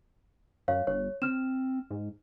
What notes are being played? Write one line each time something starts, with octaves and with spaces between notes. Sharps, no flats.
F#2 C#5 F5
G1 C#5
C4 F6 E7
G#2